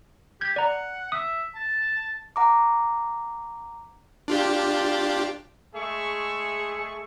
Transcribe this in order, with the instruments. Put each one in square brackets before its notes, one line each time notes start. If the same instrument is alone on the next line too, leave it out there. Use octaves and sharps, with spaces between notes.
[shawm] G4 [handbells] G6 G#6
[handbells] D5 A#5 [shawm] F#5
[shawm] E5 [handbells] D#6
[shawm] A5
[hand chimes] F#5 A#5 D6
[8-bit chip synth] D4 F4 G4
[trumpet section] G#3 A3 G#4 E5 C#6